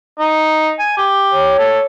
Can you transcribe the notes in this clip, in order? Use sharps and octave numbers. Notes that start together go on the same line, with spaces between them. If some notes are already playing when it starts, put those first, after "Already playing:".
D#4
G#5
G4
C#5
A4